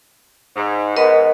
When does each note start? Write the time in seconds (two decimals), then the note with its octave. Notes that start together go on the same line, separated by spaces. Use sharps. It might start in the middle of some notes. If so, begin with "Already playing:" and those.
0.56 G#2
0.96 G#2 B3 A#4 D#5